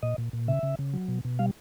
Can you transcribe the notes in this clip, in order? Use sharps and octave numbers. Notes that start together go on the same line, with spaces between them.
A#2 D#5
A#2
A#2
C#3 E5
C#3
C#3
F#3
B2
B2
G3 F5